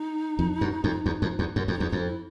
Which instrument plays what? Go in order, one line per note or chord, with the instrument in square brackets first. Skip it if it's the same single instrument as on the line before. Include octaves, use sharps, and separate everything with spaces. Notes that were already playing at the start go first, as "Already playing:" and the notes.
Already playing: [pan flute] D#4
[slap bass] F2
F#2
F2
E2
F2
E2
F#2
F2
[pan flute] D#4
[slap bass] E2
[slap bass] F2 [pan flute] D#4
[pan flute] E4